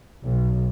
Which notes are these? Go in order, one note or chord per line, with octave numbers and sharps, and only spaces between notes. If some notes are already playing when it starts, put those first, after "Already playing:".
B1